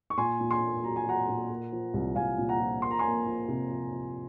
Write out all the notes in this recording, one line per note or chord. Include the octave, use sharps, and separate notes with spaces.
C#6
A#2 G#5 C6
A#2
G#5 C6
A#3
F#3 A#5
G#5
F#3 F#5 A#5
A#2
A#3
F3
C2
C2 F5 G#5
A#2
F#5 A#5
F3
A#3 C6
A#5
A#3 G#5 C6
F3
C3
F3
F3